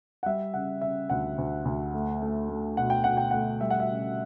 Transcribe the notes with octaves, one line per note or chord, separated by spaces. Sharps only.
F#5
G3 E5
C#3 F#5
C#3 E5
D2 F#5
D2
D2
A3
A3
A3
B2 F#5
G5
B2 F#5
G5
A3 F#5
G3 E5
F#5
E5
C#3